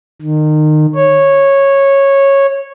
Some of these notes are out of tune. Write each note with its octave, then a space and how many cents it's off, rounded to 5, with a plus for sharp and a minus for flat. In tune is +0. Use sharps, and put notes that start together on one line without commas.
D#3 -25
C#5 -10